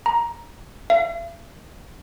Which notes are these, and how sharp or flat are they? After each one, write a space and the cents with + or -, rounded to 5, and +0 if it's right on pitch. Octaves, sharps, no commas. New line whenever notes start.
A#5 +10
E5 +45